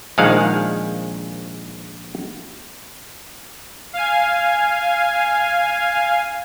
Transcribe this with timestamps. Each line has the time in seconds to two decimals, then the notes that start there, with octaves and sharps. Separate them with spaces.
0.18 A#1 D#3 F3 G#3 F5 F#5
3.93 F5 G#5